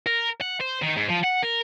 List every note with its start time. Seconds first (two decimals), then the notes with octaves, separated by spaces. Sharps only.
0.07 A#4
0.41 F#5
0.60 C5
0.82 D#3
0.96 G#2
1.09 F3
1.23 F#5
1.42 A#4